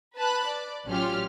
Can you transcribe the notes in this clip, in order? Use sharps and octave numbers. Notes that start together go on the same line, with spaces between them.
B4 A5 B5 F#6
D5
A1 F#3 C#4 F4 G4 F6